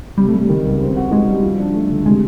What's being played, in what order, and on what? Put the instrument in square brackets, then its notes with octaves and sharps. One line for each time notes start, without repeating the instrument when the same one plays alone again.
[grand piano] C3 [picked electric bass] G3
[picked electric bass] A3
[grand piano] G3
D#3
C#2
C4
F#4
[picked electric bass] G#3 [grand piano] D#4
[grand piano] G3
F3
D4
A3
D3
[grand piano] C3 [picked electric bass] G#3